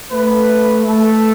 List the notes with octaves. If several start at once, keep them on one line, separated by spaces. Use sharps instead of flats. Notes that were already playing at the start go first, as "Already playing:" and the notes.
A3 B4
A3 A4